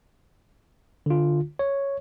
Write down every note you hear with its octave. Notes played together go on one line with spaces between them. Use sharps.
D3 F4
C#5